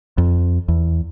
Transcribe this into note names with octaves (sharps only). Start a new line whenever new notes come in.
F2
E2